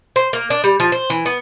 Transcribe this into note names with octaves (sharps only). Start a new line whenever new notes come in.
C5
A#3
D4
G3
F3
C5
E3
B3